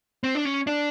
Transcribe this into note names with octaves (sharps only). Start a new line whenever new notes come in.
C4
D4
C#4
D4